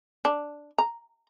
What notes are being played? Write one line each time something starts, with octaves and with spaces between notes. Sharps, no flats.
D4
A#5